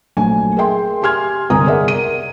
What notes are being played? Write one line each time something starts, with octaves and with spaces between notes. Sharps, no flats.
A#1 F#3 A3 G#5
G#4 A#4 E5 G5 C6
G4 G#5 C6 F6 G#6
G1 C2 G3 G#5 A#5 D#6
G#4 A#4 D5 E5 F#5
D#7